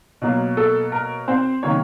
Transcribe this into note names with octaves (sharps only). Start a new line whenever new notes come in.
B2 F#3 A#3
A4
A#4
C4 C5
C3 D#3 F#3 A#3 C#4 C#5